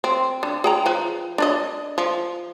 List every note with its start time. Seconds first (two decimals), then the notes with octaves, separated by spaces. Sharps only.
0.04 C4
0.43 D3
0.64 G#4 G5 A#5
0.86 F3 B4
1.38 D4 D5 D#5
1.98 F3